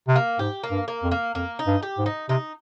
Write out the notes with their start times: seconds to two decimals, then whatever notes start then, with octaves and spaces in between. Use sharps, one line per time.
0.08 C3
0.16 A#3
0.39 G#2 G4
0.63 A#3
0.71 G2
0.88 A#3
1.03 F2
1.11 A#3
1.35 F2 A#3
1.59 D#4
1.67 G2
1.83 G4
1.98 G#2
2.06 D#4
2.29 C3 D#4